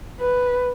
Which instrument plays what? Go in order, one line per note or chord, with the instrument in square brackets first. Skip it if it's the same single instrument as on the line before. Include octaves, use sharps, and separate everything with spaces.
[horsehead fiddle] B4